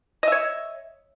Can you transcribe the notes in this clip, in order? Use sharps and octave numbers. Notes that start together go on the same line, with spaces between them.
C#5 D#5 E5